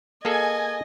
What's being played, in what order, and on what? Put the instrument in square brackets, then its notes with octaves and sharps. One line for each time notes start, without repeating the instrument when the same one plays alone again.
[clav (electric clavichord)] A#3 G#4 A4 [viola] D#5 [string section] G#5 G#6